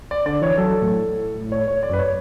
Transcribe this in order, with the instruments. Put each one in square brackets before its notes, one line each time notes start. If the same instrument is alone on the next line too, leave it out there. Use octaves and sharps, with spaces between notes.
[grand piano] D5
[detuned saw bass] D3 [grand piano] D5
[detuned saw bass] E3 [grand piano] C#5
[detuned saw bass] F#3 [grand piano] A4
[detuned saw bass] A2
[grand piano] C#5
C#5
D5
[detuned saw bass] F#2 [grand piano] B4
[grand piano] C#5